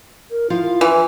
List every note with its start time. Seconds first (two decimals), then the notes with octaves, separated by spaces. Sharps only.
0.31 A#4
0.50 F3 E4 F4 F5
0.81 E3